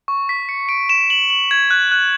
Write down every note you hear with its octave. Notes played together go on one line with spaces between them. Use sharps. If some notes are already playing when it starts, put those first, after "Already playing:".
C#6
B6
C#7
D7
E7
F#7
F#7
G#6
F#6
F#6